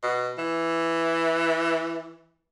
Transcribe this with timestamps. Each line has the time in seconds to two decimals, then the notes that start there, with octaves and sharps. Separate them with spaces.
0.03 B2
0.38 E3